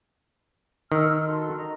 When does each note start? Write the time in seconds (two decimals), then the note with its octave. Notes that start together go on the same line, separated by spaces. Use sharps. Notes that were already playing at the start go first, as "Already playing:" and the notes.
0.92 D#3 E6 F6
1.26 F#4 A4 C6
1.56 D#5 A#5